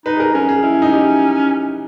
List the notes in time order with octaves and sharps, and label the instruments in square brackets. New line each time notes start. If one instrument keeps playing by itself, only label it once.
[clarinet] D#4 [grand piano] B4
[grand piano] G#4
A#4
[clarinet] C#4 [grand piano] A#4
[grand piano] G#4
[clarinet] C#4 [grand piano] E4
[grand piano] D#4
G4
E4